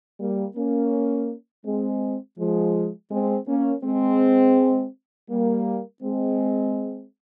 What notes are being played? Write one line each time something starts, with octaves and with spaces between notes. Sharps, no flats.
G3 A#3
A#3 C#4
G#3 C4
F3 G#3
G#3 C4
A#3 C#4
G#3 C4
G3 A#3
G#3 C4